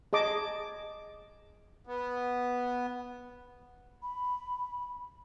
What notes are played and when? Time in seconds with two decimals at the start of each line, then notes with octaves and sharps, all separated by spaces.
0.13 G#4 D#5 A5 D6
1.87 B3
4.02 B5